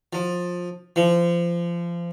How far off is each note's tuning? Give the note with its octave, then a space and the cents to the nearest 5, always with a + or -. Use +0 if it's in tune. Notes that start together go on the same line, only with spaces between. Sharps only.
F3 +20
F3 -25